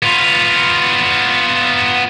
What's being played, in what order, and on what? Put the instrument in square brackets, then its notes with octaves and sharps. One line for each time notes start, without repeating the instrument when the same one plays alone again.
[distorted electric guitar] B3 F4